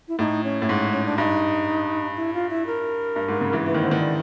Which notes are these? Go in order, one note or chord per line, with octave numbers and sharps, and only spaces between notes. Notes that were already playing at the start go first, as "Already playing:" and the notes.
E4
A2 D#4
C#4
A2
G#2
C#4
D4
G2 D#4
E4
F4
E4
A#4
G2
G#2
C#3
E3
E3 B4
D#3 C#5
D3 C5
D#3
D5